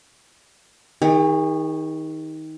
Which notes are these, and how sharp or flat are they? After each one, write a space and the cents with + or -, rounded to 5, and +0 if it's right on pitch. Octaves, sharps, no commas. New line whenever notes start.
D#3 +20 G#4 -45